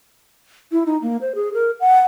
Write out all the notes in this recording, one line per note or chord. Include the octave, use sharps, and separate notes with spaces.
E4
D#4
A#3
C5
G#4
A#4
F#5